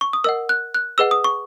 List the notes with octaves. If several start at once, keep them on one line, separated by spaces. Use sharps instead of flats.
C#6
D#6
A#4 D#5 F#5 E6
F#6
F#6
G#4 B4 D#5 F#5 E6
D#6
C#6